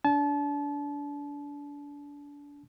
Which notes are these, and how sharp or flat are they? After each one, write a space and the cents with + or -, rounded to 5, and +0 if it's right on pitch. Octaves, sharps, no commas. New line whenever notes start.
D4 -30 A5 -30